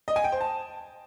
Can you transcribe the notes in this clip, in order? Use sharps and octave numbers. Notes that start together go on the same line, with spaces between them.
D#5
G#5
G5
C5
A5